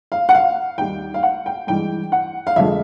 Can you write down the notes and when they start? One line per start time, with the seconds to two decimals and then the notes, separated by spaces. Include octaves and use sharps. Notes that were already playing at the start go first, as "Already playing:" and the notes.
0.12 F5
0.29 F#5
0.34 F5
0.78 D#2 D#3 G3 G5
1.14 F5
1.23 F#5
1.46 G5
1.67 G2 E3 G#3 G5
2.12 F#5
2.47 F5
2.56 F2 D3 F3 G#3 E5